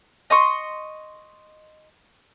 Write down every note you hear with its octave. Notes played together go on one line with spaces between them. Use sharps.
D#5 C6 C#6